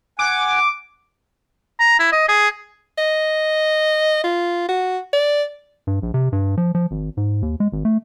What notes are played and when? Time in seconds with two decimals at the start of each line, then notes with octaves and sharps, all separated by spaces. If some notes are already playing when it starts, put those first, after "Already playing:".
0.19 F#5 G#5 D6
1.79 A#5
1.99 E4
2.12 D#5
2.28 G#4
2.98 D#5
4.24 F4
4.69 F#4
5.13 D5
5.87 G2
6.02 A#1
6.14 C3
6.32 G2
6.57 F3
6.75 F3
6.91 G#1
7.17 G#2
7.42 D#2
7.60 G#3
7.72 G#1
7.85 A3